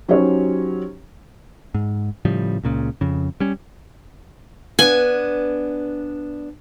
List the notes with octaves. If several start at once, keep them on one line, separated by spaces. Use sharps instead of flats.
F#3 C#4 D#4 G4 C5 C#5
G#2
A2 C#3 F3 G3
C#2 A#2 C#3
F2 C#3
G3 C#4
B3 D4 G#5